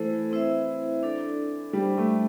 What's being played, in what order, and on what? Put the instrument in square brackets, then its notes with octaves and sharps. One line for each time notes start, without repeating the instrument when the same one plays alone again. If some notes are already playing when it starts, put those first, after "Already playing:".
Already playing: [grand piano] E3 [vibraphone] A3 E4 A4 C5
[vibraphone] C4 E4 C5 E5
D4 A4 D5
[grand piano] G3 [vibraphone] D4 G4 C5
[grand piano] A3